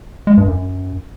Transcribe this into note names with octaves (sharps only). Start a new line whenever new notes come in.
G#3
G2
F#2